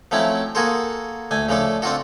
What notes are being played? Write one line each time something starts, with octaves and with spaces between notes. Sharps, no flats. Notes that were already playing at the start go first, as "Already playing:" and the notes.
F3 F#3 A3 C4 C#4 E4
A#3 F#4 G#4 A4 C5
D2 A3 G#5
C#3 F3 A3 D4 A4
C4 D4 F4 F#4 A4